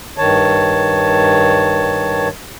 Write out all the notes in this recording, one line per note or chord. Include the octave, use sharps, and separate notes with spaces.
G2 D#3 C#5 A5